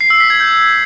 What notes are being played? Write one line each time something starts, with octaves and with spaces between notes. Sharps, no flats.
C7
E6
B6
G#6
G6